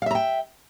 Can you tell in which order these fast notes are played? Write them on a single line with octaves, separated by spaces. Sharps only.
F5 E5 A#5 G5